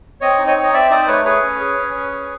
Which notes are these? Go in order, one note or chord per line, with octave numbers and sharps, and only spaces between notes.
C4 C#5 D#5
D#4
C#5 D#5
C4
D#5
C4 D5 E5
D#4 C5 D5
A3 B4 C#5
G#4 B4 C#5
C#4
G#4
C#4
C#4
G#4